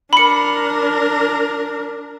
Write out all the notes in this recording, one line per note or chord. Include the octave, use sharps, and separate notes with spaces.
D4 A#4 B5 C#7